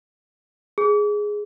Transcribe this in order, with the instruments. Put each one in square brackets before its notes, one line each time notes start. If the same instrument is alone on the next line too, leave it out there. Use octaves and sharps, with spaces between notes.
[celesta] G#4